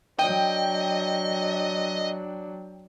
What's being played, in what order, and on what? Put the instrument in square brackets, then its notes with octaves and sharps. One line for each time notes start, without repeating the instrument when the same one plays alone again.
[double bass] F#3 D4 [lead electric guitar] D#5 [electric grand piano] G5